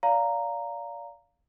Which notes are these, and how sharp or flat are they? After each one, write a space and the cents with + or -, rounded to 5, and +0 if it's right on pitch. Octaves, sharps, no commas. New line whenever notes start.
D5 -30 F5 +0 A#5 -5